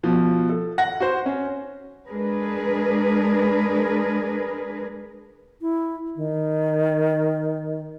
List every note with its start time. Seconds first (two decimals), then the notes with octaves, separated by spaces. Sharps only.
0.03 B2 F3
0.49 A4
0.78 F#5 A#6
1.00 F#4 C5
1.26 C#4
2.07 G#3 D4 G#4 A#4 B4
5.61 E4
6.16 D#3